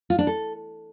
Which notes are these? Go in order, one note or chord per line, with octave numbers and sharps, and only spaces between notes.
F4
D4
A4